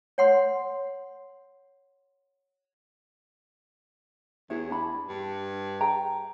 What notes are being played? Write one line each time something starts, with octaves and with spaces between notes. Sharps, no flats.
C#5 F#5 C6
E2 E4 G#4 C#5
D4 B5
G2
G#4 G5 A#5